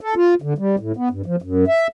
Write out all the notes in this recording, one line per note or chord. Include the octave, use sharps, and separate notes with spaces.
A4
F4
D3
G3
A2
B3
G2
F3
F#2
E5